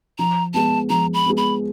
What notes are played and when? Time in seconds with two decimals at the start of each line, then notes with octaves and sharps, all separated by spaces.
0.19 F3 A#5
0.54 G#3 B3 A5
0.90 F3 A#5
1.14 B5
1.26 G#3 B3
1.37 B5